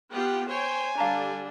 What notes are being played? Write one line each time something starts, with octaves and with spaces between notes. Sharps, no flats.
B3 F4 G4 F#5 G5
C5 C#5 G5 G#5
D3 G3 D4 F5 A5 A#5